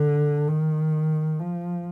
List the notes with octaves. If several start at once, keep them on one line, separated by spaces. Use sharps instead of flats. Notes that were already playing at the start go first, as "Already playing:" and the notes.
Already playing: D3
D#3
F3